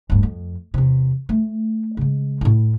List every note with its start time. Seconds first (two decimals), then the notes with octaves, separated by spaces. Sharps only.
0.10 D1 G2
0.23 F2
0.74 E2 C3
1.29 A3
1.97 C#3 G#3
2.41 A2 E4